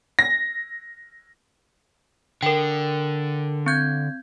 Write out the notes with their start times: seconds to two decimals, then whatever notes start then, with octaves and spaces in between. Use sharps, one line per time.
0.19 A#6
2.42 D3 A#4 G5
3.66 C4 G6 G#6